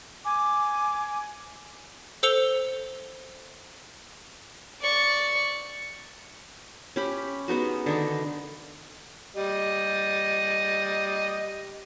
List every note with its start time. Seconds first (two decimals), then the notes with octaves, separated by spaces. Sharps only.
0.24 G#5 D6
2.23 A4 C5 E6 C#7 F7 G7
4.81 D5 C#6
6.96 C#4 G4 B5
7.48 G#3 B3 D#4 F#4
7.86 D3 D#3 D#4
9.36 G3 D#5